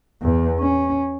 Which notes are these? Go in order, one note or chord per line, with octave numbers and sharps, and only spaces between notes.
E2
C#4